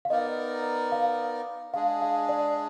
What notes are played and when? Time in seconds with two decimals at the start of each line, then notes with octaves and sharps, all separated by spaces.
0.05 F5
0.10 B3 D#4 A#4 D5 D#5
0.92 F5
1.74 G#3 D4 G#4 F5
2.02 F5
2.29 D5